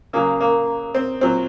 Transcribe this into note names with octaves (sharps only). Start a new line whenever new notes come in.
C#3 F#3 A#3
A#3
C4
A#2 F#3 C4